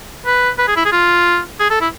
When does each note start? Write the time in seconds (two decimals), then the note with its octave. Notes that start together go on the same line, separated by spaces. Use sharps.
0.26 B4
0.59 B4
0.68 G#4
0.77 E4
0.86 G#4
0.92 F4
1.60 G#4
1.71 A4
1.81 E4